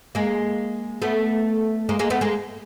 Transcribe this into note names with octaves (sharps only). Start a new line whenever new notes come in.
G#3 A#3
A3 B3
G#3 A#3
G#3 A#3
A3 B3
G#3 A#3